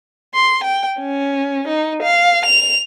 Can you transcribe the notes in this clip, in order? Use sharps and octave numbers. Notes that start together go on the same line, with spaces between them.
C6
G5
C#4
D#4
F5
F7